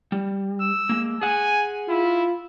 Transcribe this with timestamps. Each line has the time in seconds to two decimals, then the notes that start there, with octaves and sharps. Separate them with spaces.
0.12 G3
0.60 E6
0.89 G#3 A#3
1.22 G#4 F#5 G#5
1.89 E4 F4